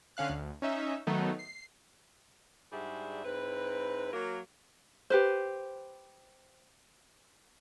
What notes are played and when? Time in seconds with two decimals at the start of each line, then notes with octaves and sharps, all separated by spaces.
0.17 D3 C#4 F5 F#6
0.30 D2
0.62 C#4 D#4 E5
1.07 D#3 F#3 A3 B3 D#4
1.39 C7
2.73 G#2 G3 D4 F#4 G#4 E5
3.25 G#2 C4 E4 B4
4.13 F#3 A#3 A#4
5.10 G4 B4 C5